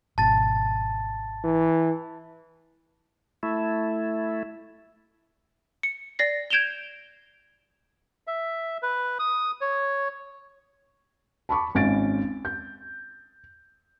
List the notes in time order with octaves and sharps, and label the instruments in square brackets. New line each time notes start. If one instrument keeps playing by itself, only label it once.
[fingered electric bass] G#1 B2 [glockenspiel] A5 A6
[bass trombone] E3
[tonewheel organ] A3 E4
[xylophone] C#7
D5 A#6 C7
G6 G#6 D7 E7 F7 G7
[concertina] E5
B4
D#6
C#5
[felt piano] A5 B5 C#6 D6
G#1 C#4 F5 A6 D7
G6